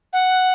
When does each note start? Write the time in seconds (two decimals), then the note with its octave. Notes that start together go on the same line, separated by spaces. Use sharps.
0.13 F#5